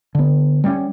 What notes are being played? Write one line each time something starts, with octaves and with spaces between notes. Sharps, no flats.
D3 B3
G3 A#3 C#4